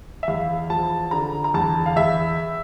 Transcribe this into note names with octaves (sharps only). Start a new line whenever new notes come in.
E5
E2 F5
F3 A5
D3 A#5
A#5
E2 A5
F5
E2 E5